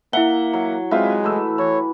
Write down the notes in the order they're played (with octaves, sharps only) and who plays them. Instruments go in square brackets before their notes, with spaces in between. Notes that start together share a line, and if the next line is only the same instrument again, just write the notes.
[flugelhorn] A#3 [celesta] E4 G7 [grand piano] E5 F#5
[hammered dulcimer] F#3
[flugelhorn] G#3 [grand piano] C4 F4 E5 [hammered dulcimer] B4
[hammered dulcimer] E3 [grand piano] A3 E6
[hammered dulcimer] E3 [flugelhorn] C#5